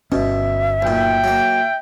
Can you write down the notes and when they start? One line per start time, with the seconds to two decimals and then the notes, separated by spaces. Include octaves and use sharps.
0.12 G1 B2 C#4 E5
0.82 B1 A#2 G5
1.24 F#3 A#3